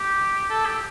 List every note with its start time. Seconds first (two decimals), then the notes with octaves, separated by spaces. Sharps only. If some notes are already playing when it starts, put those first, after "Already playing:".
Already playing: G4
0.50 A4
0.66 G4